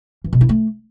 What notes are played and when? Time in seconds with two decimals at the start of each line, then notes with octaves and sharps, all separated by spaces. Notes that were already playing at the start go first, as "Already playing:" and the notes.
0.24 E3
0.33 B2
0.41 E4
0.49 A3